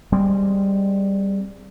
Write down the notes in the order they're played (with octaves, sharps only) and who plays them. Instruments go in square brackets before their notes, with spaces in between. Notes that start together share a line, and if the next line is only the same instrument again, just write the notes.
[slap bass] G3 G#3 C4